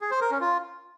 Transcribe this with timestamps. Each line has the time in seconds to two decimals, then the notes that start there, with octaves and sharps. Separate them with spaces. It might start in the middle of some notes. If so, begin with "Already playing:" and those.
0.01 G#4
0.11 C5
0.21 A#4
0.31 C#4
0.41 F4